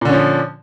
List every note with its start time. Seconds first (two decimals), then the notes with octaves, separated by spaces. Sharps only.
0.01 A#2
0.05 D3
0.09 C#4
0.13 F3